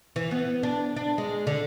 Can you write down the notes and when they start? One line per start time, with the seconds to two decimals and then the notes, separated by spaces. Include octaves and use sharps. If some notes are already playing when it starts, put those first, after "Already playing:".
0.16 E3
0.31 B3
0.63 D4
0.96 D4
1.18 G#3
1.47 D3